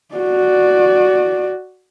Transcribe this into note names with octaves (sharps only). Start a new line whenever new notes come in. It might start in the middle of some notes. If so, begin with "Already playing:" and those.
F#4 D5